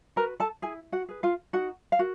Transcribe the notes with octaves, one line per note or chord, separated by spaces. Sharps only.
F#4 A#4 B4 A#5
A4 A5
E4 G#4 G#5
F#4 F#5
G#4 B4
F4 F5
D#4 F#4 F#5
F5
F#4 A#4